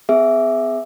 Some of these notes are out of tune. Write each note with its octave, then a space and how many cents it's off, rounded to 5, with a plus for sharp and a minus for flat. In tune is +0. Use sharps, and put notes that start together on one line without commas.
B3 +45 G#4 +0 E5 +0